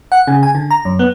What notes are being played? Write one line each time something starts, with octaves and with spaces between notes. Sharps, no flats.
F#5
C#3
G#5
D3
A#5
F#2
B3